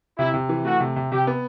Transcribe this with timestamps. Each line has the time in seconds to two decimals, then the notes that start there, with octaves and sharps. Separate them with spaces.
0.18 C3 E4
0.34 C3
0.49 E3
0.65 A3 F#4
0.80 C3
0.96 C3
1.11 C3 G4
1.27 B3